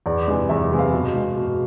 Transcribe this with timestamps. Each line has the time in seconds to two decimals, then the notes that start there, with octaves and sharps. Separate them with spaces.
0.06 E2 D5
0.28 C3 E3 G#3
0.49 E2 E5
0.71 C3 E3 G#3
0.79 F5
0.92 B2
1.14 G#3
1.37 B2